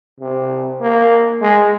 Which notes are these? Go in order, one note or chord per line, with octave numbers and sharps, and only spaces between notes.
C3
A#3
G#3